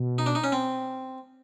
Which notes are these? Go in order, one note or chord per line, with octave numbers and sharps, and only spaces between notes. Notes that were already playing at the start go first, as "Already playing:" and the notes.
Already playing: B2
D#4
D4
D#4
C#4
C4